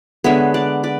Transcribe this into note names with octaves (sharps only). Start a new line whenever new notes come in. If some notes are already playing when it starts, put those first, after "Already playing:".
D3 G#3 B3 C#5 E5
D5 F#5
B4 D5